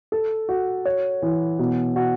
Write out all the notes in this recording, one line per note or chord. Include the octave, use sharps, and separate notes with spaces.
A4
F#4
C#5
E3
B2
F#4